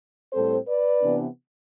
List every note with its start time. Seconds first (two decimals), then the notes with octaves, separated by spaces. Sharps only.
0.32 A2 G3 C4 A4 C5
0.67 B4 D5
1.02 C3 E3 B3 D4